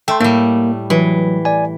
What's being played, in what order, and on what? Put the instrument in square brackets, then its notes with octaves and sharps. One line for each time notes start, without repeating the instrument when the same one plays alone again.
[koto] A3 [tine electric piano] G5 C6
[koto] A2 G3 [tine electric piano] A#3
[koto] E3 [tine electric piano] F#3
[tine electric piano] D5 G#5